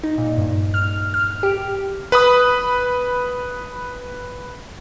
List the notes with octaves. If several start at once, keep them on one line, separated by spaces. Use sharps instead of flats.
D#4
A#2
G2
F6
F6
G4
B4 B5 D#6